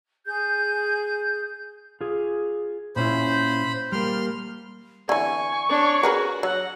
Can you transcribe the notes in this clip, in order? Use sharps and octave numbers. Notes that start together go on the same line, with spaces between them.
G#4 G6
F4 G#4
A#2 C#4 E4 C5 B5
G3 A#3 C6 F6
D3 E3 G#5 C#6
D4 C#5
F#4 G#4 A#4 B4
F#3 F#5